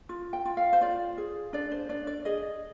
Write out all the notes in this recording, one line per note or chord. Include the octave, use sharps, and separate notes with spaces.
F4
G5
F4
F5
C5
F4 D5
G#4
D4 D5
C5
D4 D5
D5
G#4 D#5